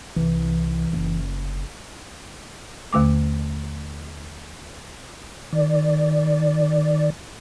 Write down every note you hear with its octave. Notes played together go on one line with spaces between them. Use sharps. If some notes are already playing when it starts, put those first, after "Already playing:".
C2 E3
F#1
D#2 D3 A3 D6
D#3 D5